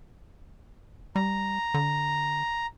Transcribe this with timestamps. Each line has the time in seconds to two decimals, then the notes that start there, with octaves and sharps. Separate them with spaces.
1.16 G3 A#5
1.74 D3